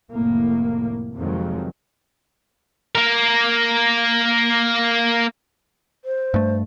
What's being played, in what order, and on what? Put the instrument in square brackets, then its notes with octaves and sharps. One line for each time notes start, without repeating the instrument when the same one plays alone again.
[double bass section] F1 A2 A#3
F2 C3 D#3 F#3 G#3
[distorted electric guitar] A#3 A#4
[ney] C5
[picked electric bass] G2 A3